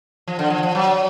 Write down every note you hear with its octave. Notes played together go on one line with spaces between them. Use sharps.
F3
D3
F3
F3
F#3